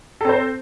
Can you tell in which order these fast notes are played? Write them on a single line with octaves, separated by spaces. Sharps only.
A4 C4 C5